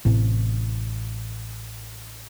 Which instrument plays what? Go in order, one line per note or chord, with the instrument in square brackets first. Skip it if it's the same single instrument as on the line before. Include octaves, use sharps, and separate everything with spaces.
[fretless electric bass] A1 A2 C3 C4